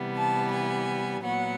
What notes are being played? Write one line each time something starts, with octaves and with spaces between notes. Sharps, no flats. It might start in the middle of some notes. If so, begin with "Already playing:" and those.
Already playing: C3 E3 G3 B3
A5
G#5
A#2 F#3 B3 F#5